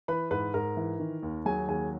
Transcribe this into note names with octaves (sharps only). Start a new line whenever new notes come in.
E3 B4 B5
G#2 B4 B5
G#2 A#4 A#5
E3
D#3
D#2
F#3 G#4 G#5
D#2 G#4 G#5